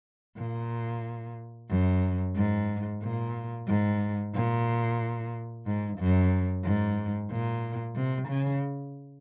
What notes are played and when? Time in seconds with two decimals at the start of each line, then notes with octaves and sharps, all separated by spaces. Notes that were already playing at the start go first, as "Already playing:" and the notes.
0.38 A#2
1.70 F#2
2.35 G#2
3.02 A#2
3.67 G#2
4.34 A#2
5.66 G#2
5.98 F#2
6.63 G#2
7.30 A#2
7.95 C3
8.28 C#3